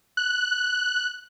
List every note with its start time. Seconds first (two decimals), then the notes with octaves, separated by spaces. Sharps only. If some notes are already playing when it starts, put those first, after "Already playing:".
0.17 F#6